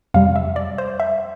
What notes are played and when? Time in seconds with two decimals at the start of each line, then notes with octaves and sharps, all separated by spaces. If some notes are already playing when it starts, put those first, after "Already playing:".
0.14 F2 C3 G3 F5
0.36 E5
0.56 D5
0.78 C5
1.00 E5